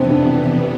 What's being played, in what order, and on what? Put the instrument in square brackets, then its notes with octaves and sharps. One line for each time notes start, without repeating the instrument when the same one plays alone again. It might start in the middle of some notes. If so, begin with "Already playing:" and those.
Already playing: [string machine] F2 C3 E3 B3 [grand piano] C4 D4 C5 D5
[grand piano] D4 D5